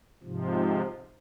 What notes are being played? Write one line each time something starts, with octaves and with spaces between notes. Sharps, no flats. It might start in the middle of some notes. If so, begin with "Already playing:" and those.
G#2 C3 F3